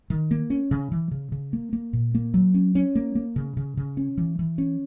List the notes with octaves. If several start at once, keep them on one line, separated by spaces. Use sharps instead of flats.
D#3
A#3
C#4
C#3
E3
C#3
C#3
A#3
A#3
A#2
A#3
F#3
C#4
C#4
A#3
A#3
C#3
C#3
C#3
C#4
E3
E3
C#4